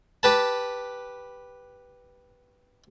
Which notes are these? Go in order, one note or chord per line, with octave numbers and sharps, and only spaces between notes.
G4 B4 A5